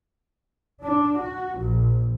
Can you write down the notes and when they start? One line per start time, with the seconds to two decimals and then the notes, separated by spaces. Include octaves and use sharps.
0.83 D4
1.20 F#4
1.59 A#1